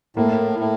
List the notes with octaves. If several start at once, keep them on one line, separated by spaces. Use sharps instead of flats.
A2 A#3
A2